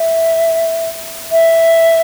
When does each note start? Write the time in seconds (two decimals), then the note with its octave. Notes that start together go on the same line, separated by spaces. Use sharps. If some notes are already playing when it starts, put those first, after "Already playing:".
Already playing: E5
1.31 E5